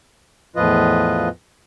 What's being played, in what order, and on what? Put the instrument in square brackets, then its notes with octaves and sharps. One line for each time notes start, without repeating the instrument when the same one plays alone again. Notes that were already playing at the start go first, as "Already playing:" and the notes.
[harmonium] E2 A2 F3 F4 B4 D#5